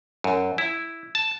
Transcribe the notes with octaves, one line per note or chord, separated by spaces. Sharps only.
F#2
E4
A5